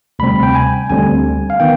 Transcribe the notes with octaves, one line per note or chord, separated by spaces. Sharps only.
D2 C3 G3 C4 B5
G5
G#5
D2 D3 G3 C4 G#5
F5
D#3 B3 G5